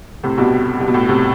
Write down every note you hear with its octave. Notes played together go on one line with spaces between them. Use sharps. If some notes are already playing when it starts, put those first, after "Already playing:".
A2 C3
G2 B2
G2
B2
A2
A2 C3